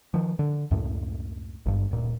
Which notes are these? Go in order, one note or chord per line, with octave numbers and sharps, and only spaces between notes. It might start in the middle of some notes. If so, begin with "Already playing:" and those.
D#3 F3
D3
C#2 F#2 A2
G#1 G2
D1 A#2